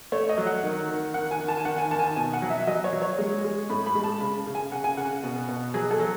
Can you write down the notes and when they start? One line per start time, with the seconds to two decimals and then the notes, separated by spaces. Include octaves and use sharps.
0.12 A3 C#5
0.29 D#5
0.38 F#3
0.47 F#5
0.63 D#3
0.89 D#3
1.14 D#3 F#5
1.31 G#5
1.40 D#3
1.48 A5
1.57 G#5
1.65 D#3 F#5
1.78 G#5
1.91 D#3 A5
1.99 G#5
2.04 A5
2.16 B2 G#5
2.33 F#5
2.42 F#3
2.50 E5
2.67 F#3 D#5
2.84 C#5
2.93 F#3
3.02 C#5
3.18 G#3
3.44 G#3
3.70 A2 B5
3.86 B5
3.95 G#3
4.04 A5
4.21 C#3 B5
4.47 C#3
4.55 G#5
4.72 C#3 F#5
4.84 G#5
4.97 C#3 F#5
5.23 B2
5.48 B2
5.74 F#3 G#4
5.91 A4
6.00 F#3